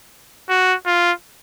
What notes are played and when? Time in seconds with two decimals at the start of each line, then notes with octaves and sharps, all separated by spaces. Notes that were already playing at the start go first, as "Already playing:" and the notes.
0.49 F#4
0.86 F4